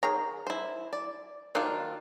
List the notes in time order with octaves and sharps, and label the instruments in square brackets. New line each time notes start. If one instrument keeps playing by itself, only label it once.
[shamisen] D#3 G#4 C#5 [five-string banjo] A#5
[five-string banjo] E4 C5
D5
[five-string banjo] D#3 D4 F4 [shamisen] F3 F#3 A#3